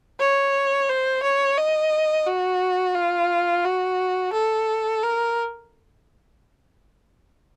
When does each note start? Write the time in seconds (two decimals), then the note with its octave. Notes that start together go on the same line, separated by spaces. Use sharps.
0.20 C#5
0.89 C5
1.23 C#5
1.58 D#5
2.26 F#4
2.95 F4
3.65 F#4
4.33 A4
5.03 A#4